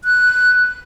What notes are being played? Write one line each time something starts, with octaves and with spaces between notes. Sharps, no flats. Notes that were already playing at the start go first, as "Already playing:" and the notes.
F#6